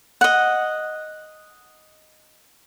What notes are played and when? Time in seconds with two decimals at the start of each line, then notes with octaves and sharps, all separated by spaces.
0.21 D#5 F#5